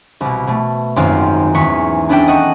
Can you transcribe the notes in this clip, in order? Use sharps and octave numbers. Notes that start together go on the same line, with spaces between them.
C2 B2
B2 A3
G#1 F#2 D#3 C4 F4
G#1 E2 C#6 B6 C#7
B3 C#4 D4 E4 A4 G5
D#5 F#5 C#6